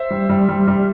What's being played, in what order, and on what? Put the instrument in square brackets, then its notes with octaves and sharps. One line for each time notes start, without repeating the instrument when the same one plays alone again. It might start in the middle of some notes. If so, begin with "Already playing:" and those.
Already playing: [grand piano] C5 E5
G3
G3
G3
G3